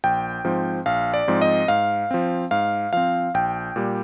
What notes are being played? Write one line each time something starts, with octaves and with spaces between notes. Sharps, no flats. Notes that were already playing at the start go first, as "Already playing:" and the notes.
A#1 G5
G#2 F3 C4
A#1 F5
D5
G#2 F3 C4
D#5
G#2 F5
F3 C4
G#2 F5
F3 C4 F5
A#1 G5
A#2 G3